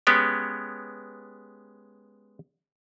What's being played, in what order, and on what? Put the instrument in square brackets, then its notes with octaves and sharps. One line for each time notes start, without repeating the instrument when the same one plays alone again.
[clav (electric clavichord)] G#3 B3 C#4 G4